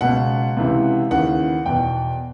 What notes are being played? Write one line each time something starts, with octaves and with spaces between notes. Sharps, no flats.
C#2 B2 F#5
C#2 C3 E3
D#2 C#3 E3 F#5
E2 B2 G5